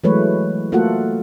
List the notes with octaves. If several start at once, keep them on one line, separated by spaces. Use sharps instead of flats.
E3 F#3 G#3 A3 B4 C#5
A3 A#3 F4 F#4 A4 F#5